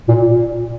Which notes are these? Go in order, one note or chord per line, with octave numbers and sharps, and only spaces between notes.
A#2